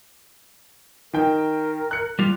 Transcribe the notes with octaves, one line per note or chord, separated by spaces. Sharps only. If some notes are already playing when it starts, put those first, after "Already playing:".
D#3 A#4 G5
F#6 C#7
G3 F4